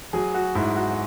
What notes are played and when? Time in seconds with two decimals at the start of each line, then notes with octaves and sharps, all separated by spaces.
0.13 F#3 G#4
0.34 F#4
0.55 G#2 E4
0.76 F#4